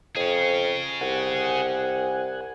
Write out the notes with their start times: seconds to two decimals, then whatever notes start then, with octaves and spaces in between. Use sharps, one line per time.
0.16 F2 G#4 C#5
1.01 C2 F#5 G#5